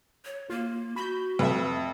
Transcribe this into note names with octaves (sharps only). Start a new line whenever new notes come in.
C#5
A#3 F4
F#4 B5 G6
F2 B4 E5